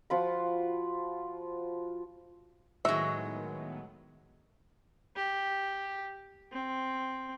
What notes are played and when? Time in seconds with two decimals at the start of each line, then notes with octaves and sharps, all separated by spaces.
0.10 F3 F4 F#4 B5
2.85 A2 D#3 F#3 G#3 B3 E5
5.16 G4
6.52 C4